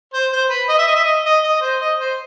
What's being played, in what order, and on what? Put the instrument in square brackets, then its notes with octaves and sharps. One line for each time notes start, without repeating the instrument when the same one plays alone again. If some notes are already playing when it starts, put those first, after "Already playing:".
[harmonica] C5
C5
B4
D#5
E5
D#5
E5
D#5
D#5
D#5
C5
D#5
C5